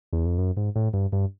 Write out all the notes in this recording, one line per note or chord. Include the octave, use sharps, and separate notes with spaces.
E2
F2
F#2
G#2
A2
G2
G2